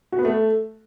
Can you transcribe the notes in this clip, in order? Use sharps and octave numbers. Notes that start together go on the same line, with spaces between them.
F#4
B3
A3